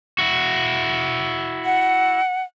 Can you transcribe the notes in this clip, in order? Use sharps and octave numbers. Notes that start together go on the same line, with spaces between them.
E4 F#4
F#5